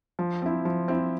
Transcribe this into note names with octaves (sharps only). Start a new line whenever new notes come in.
F3
C4 E4
F3
C4 E4